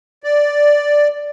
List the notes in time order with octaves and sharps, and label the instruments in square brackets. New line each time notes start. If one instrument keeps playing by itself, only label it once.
[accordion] D5